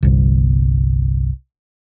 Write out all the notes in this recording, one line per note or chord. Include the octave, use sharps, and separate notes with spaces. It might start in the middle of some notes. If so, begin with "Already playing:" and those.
G1 C2